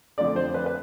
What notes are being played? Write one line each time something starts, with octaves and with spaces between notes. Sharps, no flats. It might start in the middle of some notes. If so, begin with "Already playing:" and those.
F2 D3 A3 D5
C5
B4
B4